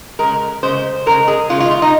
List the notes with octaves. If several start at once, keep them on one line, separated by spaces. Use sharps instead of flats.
C#3 G#3 A#4
C#3 G#3 C5
C#3 G#3 A#4
G#4
C#3 G#3 F4
F4
F4
D#4